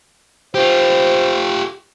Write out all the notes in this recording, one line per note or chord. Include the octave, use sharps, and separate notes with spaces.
F4 G4 C5